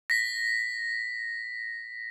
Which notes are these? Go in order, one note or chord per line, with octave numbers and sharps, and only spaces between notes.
A#6 B6